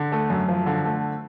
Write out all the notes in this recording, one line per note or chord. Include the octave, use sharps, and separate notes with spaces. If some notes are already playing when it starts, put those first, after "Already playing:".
Already playing: D3
A3
F#2
F3
D3
A3